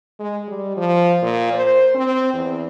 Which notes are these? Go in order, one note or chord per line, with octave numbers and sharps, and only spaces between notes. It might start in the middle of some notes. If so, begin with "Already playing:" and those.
G#3
G3
F3
A#2
C5
C4
E2